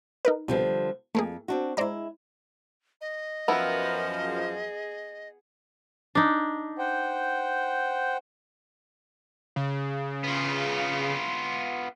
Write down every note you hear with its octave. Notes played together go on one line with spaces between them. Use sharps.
D#4 A#4 B4
C2 B2 D3 F3 G3
F2 A3 A#3 G#4
C4 D4 F#4
G#3 E4 C5 D5 A#5
D#5
F#2 F3 B3 E4 A#4 B4
G#4
D4 D#4
C5 F#5 G5
C#3
B3 F4